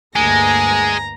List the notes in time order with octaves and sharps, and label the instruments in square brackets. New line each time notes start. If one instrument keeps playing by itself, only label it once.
[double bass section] D2 G2 A#3 [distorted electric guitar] G#3 [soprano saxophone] G#5 [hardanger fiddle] A#5